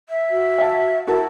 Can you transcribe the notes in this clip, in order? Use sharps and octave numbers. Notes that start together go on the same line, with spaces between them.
E5
F#4
F5 A5
E4 F#4 A#4 A5